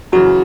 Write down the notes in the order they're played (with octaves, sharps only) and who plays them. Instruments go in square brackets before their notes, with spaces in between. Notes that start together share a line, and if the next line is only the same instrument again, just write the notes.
[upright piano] F#2 C#3 E3 [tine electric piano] F#4